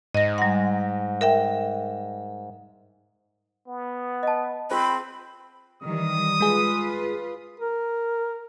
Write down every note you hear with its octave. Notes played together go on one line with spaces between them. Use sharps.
G#2 D#5 A#6
G3 F#5
A#4 E5 G5
B3
D#5 A5
C4 F4 G#4 C5 B5
D#3 E3 G3 D#6
G#3 F4 G#4 B4
A#4